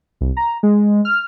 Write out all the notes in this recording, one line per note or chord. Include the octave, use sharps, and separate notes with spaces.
C2
A#5
G#3
F6